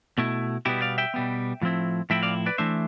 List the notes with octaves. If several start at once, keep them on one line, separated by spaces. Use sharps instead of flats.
B2 A3 E4
B2 G3 B3 E4 G4
D5 F5
E5 G5
B2 G3 B3
A2 F3 C4 E4
A2 F3 C4 E4 E5 G5
D5 F5
B4 D5
E3 A3 D4 C5 E5